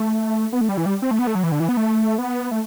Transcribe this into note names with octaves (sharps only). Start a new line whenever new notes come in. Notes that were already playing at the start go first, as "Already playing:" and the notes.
Already playing: A3
B3
A3
G3
E3
G3
C4
A3
B3
A3
F#3
E3
D3
E3
B3
A3
B3
A3